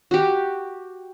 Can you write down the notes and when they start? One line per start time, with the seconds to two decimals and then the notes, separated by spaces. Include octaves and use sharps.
0.11 F#4 G4